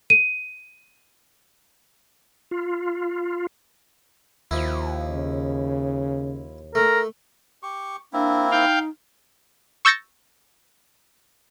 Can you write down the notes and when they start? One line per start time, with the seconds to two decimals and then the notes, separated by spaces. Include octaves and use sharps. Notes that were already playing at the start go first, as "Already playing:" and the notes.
0.10 D#7
2.51 F4
4.51 D#2 F3 E4
5.10 C#3
6.75 A3 A#4
7.63 G4 C#6
8.13 A#3 C4 D4 E4
8.51 D#4 F5 G5
9.85 C#6 E6 G6 A6 A#6 C#7